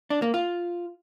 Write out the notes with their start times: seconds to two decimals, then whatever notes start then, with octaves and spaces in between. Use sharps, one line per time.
0.10 D4
0.22 A#3
0.34 F4